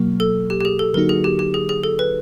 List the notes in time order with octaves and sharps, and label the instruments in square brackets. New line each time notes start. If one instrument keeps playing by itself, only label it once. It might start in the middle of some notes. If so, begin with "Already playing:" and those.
Already playing: [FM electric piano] B2 F#3 A#3
[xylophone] A4
G4
G4
G#4
A4
[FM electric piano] D3 F#3 A#3 D#4 F#4 [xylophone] A#4
[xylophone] G#4
G4
G4
G#4
G#4
A4
B4